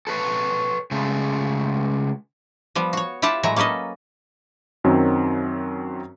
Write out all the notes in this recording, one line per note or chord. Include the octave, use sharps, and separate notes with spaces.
A4 B4 C#5
C#3 G#3 A3
F3 G3 B3
F#4 C#5
E4 F4 G4 F#5 A5
A2 F#3 G#3 E4 C#5 A#5
A#3 C#4 A4 B4 D#5
F#2 D#3 F#3 C4